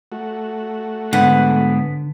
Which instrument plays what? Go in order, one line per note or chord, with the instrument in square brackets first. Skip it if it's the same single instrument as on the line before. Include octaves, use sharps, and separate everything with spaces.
[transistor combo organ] A3 F#4
[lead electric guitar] G#2 B3 [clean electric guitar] D3 [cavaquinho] F#5